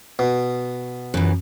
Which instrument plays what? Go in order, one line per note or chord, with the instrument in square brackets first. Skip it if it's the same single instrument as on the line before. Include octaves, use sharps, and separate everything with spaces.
[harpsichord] B2
[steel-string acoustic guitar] F#2 E3